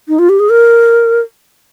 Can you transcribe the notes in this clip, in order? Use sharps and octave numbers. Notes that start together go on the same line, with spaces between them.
D#4
F4
G4
G#4
A#4